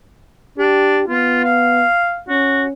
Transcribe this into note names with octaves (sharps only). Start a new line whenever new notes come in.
D4 G4
B3 F4
F5
C#4 F#4